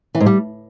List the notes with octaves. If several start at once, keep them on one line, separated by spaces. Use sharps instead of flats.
E3
G#2
G3